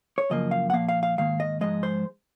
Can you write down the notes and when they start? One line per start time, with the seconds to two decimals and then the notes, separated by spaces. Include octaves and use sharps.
0.18 C#5
0.30 F#2 C#3 F3 A#3 D#5
0.51 F5
0.70 F#5
0.73 A#2 F3 A#3 F5
0.89 F5
1.03 F5
1.18 G#2 D#3 A#3 F5
1.40 D#5
1.61 G#2 F3 G#3 D#5
1.83 C5